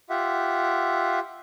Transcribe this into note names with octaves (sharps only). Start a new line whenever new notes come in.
F4 G4 E5 F#5